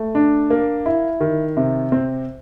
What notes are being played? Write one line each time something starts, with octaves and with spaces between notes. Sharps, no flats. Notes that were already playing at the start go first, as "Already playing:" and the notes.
Already playing: A3
D4
A#3
E4
D#3
C3
C4